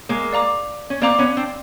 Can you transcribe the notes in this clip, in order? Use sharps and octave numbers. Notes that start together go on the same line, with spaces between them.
G#3 A#3
D5 F5 A#5 D6
C#4
A#3 C4 D5 F5 A#5 D6
B3 C#4
C4 D4